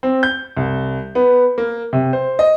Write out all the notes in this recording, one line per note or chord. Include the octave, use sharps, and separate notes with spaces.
C4
G6
C2
B3
A#3
C3
C5
D#5